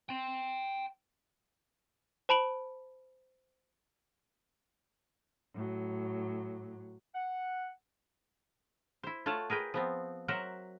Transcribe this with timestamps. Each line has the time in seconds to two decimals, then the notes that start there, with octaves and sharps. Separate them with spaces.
0.09 G5 C6
2.29 C5 A5 B5 D7 F#7
5.54 A2 F#3
7.15 F#5
9.03 E4 C5
9.26 A3 F4 C#5 F#5 A5
9.50 G#4 A#4 B4 G5
9.74 F3 B3 C4
10.28 F#3 A#4 C5 E5 F#5